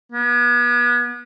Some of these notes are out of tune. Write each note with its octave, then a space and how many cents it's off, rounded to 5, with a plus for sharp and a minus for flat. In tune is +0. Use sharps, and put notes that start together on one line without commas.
B3 -35